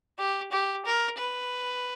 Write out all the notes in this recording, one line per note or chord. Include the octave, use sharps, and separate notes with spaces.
G4
G4
A#4
B4